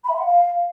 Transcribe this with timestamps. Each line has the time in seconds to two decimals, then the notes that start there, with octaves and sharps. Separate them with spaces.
0.04 B5
0.09 E5
0.14 C6
0.19 F#5
0.24 F5